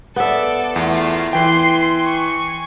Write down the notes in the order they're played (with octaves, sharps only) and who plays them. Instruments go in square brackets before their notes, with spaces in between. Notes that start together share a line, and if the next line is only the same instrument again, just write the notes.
[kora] B3 E5 [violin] A4 D5
[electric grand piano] E2 [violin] A3 F4
[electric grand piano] E3 G5 [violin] C6
[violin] G#5 C#6